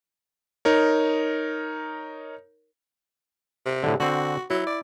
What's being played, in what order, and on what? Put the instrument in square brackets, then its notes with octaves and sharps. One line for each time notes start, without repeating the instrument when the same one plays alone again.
[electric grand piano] D#4 A#4 C#5
[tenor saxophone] C3
[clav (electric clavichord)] A2 D3
[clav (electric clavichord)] D3 C4 [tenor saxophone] F#4
[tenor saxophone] F#3 [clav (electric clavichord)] E4
[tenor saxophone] D5